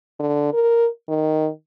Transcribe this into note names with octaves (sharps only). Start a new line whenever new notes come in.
D3
A#4
D#3